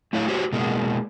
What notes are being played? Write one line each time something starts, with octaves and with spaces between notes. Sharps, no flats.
A3 E4 C#5 F5
F#4 G4 C5 C#5
B2 G#3 A#3